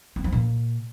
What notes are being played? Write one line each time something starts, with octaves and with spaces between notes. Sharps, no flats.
C4
F3
A#2